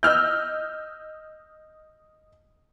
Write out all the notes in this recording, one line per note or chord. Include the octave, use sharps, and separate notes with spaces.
D#5 E6 F6 G6